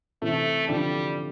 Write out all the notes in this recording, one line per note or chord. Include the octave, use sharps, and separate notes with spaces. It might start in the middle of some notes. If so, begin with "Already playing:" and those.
C3 E3 A3
D3 F3 G3